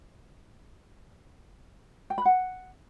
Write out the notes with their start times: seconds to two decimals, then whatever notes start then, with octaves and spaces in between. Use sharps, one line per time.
2.10 G5
2.18 B5
2.25 F#5